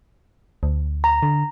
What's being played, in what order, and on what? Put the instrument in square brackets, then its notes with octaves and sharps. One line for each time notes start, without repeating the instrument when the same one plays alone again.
[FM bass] D2
[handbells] A#5
[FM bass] D3